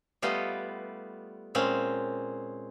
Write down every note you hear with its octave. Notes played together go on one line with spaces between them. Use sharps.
G3 A3 B3 F4 G4 D#5
A#2 G#3 C4 C#4